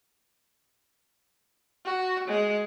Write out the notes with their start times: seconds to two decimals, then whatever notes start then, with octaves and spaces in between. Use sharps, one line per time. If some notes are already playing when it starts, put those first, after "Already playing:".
1.85 F#4
2.28 G#3